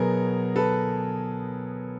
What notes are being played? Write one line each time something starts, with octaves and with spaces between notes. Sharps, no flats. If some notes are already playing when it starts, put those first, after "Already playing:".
Already playing: B2 F#3 B3 G#4 A#4
A4 B4